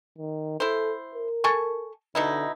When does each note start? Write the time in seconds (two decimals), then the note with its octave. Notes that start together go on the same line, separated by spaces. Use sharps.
0.18 D#3
0.60 E4 A4 C5
1.15 A#4
1.44 A4 G#5 C#6
2.15 B2 D3 D#4 E4